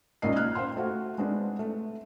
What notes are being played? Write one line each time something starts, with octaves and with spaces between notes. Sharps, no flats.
A#1 G#2 C#3 A#4 D#5 C7
F6 F#6 G#6
C5 F5 G5 C6
A3 F#4 F5
G#3 B3 C4 D4
A3